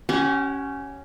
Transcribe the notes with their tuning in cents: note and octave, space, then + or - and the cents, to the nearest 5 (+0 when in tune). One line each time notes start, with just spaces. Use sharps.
C#4 +0 G4 -35 F#5 +10